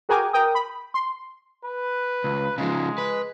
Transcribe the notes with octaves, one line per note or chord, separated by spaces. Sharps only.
F#4 G#4 A#4 G5 G#5 D6
A#4 G5 D#6
B5
C6
B4
C#2
C#3 F3 G#3
B4